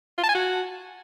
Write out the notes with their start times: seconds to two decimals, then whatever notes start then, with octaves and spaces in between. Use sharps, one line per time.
0.18 F4
0.24 A5
0.29 G#5
0.35 F#4